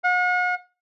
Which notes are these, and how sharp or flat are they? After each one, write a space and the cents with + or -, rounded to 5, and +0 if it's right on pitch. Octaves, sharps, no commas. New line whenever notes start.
F#5 -40